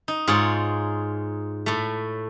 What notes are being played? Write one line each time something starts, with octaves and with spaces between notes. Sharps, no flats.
D#4
G#2 F4 G#4 C#5
A2 A3